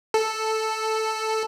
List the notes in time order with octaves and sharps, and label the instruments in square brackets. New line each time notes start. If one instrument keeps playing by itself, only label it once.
[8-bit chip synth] A4